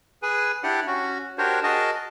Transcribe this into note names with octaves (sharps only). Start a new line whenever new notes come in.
G#4 B4 G#5
D4 E4 G4 D5 F#5
C#4 F#4
D4 F#4 G4 A#4 C5 C#5
F#4 G#4 A#4 D#5 A5